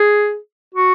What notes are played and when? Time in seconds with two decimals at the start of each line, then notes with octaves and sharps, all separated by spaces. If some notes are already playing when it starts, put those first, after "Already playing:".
Already playing: G#4
0.75 F#4